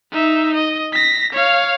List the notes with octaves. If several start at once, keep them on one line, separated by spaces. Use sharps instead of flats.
D#4 E5
D#5
A#6 B6
C#5 F5